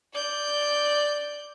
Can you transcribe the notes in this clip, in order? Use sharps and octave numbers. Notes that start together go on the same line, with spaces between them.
D5 G6